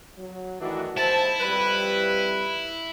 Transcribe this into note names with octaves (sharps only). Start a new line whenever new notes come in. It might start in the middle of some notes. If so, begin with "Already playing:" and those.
F#3
D#3 E3 A3 D4 F#4
D#2 G#2 E4 C5 A5
F2 G3 B4